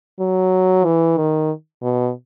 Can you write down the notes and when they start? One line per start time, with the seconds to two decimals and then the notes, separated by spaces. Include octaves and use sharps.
0.20 F#3
0.85 E3
1.17 D#3
1.82 B2